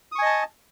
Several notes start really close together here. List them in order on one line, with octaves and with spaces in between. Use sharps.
D#6 C#6 G#5 D#5 A5